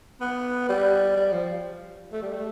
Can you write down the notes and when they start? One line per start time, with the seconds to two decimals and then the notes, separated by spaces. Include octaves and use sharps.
0.21 B3
0.69 G3
1.16 G3
1.33 F3
2.13 A3
2.22 G3
2.32 A3